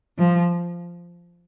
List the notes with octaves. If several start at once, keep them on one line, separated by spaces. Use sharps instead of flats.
F3